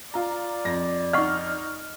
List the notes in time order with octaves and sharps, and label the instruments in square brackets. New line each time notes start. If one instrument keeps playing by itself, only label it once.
[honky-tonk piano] F4 A#5 [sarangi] D5
[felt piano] F2 A#6
[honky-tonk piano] D#4 F6 [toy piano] D#5 F#5 C#6